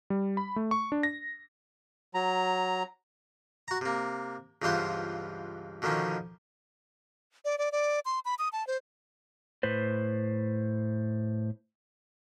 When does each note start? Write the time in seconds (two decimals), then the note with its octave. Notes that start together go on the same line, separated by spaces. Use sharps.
0.10 G3
0.37 B5
0.56 A3
0.71 C#6
0.92 D4
1.03 A#6
2.14 F#3 A#5
3.68 F#4 A#5
3.81 C3 A#3
4.62 C#2 G2 E3 B3 F4 C5
5.82 B2 D3 D#3 F3 C#4
7.45 D5
7.58 D5
7.72 D5
8.05 C6
8.25 B5
8.39 D#6
8.53 A5
8.67 C5
9.63 A2 B4 C5